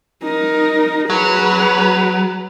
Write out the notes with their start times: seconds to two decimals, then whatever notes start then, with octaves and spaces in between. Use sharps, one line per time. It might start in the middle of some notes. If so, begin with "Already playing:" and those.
0.22 D#4 A#4
1.10 F#3 G#4 B4